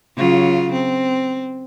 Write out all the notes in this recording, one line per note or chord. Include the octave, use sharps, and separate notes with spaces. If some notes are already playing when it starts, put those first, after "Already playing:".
C#3 F#3 F4
C4